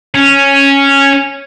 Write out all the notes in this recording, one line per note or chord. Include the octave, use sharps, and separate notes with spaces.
C#4